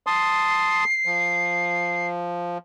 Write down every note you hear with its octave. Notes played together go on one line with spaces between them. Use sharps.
A5 C6 D#6 C7
F3